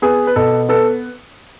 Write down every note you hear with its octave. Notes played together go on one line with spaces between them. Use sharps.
B3 G#4
B4
B2 A4
B3 A4